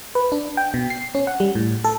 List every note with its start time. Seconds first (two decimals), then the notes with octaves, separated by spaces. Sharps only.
0.15 B4
0.32 D4
0.57 G5
0.74 B2
0.90 C7
1.15 C#4
1.27 F#5
1.40 G3
1.55 A2
1.84 A4